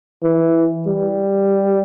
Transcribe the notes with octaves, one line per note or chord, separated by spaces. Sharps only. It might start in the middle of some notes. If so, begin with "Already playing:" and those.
E3
G3